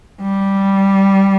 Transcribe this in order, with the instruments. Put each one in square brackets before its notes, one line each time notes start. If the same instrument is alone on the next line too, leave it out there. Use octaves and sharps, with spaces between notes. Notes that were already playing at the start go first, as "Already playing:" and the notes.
[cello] G3